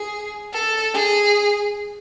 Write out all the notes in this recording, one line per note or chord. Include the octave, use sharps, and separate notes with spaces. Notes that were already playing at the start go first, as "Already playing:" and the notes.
Already playing: G#4
A4
G#4